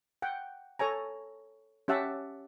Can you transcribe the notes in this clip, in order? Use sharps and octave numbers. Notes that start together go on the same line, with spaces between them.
F#5 G5
A4 C#5 G#5 A#5
C#4 G4 E5 F#5 A5